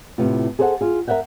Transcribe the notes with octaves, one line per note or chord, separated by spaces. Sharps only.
A2 C3 B3 F4
G#4 A4 C5 C#5 F#5
F4 G#4
A#4 D5 E5 F#5 G5